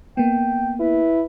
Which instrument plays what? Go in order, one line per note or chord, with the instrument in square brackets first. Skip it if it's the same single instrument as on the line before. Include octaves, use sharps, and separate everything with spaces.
[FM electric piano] A#3 B3 [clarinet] G5
[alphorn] E4 [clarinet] B4